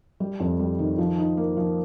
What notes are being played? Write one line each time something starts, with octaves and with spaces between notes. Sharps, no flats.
G3
F2
G3
D#3
F3
D#4
A#3
F3